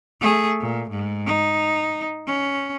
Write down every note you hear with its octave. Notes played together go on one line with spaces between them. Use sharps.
A3 G#4
A#2
G#2
D#4
C#4